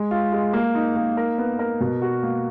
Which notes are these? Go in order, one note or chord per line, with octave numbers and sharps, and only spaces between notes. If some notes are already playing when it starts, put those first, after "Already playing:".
Already playing: G#3
F4
G#3
A#3
D#4
A#3
A#4
B3
A#4
B2
F#4
A#3